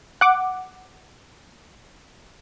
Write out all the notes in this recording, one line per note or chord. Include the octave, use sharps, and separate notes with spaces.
F#5 D6